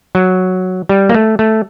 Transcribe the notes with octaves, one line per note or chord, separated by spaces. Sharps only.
F#3
G3
A#3
A3
A3